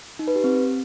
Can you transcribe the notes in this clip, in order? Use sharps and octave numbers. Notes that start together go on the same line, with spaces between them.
D#4
B4
G4
C4